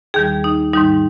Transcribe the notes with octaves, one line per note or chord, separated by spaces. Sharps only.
D#2 D#3 G3 G#4
D#4
G#2 D#3 G3 D#4